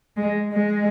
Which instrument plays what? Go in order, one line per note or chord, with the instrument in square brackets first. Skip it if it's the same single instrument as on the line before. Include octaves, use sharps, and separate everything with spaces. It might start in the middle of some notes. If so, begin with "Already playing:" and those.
[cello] G#3
G#3